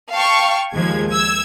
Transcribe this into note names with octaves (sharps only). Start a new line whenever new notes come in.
F5 G5 A5 C#6
D#2 F3 G#3 G#6
E6 G#6